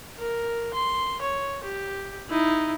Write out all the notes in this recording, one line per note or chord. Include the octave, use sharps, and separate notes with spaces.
A#4
C6
C#5
G4
D#4 E4